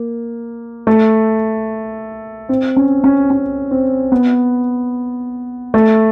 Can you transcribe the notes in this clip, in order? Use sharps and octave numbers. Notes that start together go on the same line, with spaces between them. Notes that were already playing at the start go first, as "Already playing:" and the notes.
Already playing: A#3
A3
C4
C#4
C#4
C#4
C4
B3
A3